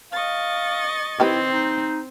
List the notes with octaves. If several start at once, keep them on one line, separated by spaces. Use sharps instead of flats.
D#5 F5 C#6 A6
D#3 C4 E4 G4 B4
D#4